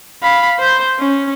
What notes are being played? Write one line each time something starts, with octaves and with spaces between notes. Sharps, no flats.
F5 B5
C5 G6
C#4